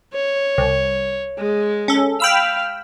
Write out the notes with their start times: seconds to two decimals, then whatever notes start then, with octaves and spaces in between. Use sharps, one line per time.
0.13 C#5
0.58 C2
1.38 G#3
1.88 C#4 A4
2.20 F5 G5 B5 E6